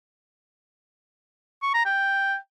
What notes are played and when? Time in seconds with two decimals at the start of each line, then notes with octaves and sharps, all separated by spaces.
1.62 C#6
1.74 A#5
1.85 G5